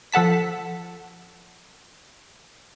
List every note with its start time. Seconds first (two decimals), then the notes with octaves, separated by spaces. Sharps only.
0.12 F3 A4 F#5 A5 B6